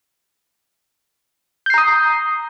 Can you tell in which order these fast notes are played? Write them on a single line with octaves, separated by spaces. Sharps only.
G6 C7 A#5 D#6